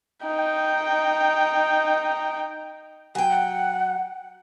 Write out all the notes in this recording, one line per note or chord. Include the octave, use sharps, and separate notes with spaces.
D#4 G5
F#3 G5 G#5
F#5